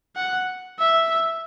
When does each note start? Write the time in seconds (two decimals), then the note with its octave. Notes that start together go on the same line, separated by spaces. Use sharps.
0.16 F#5
0.79 E5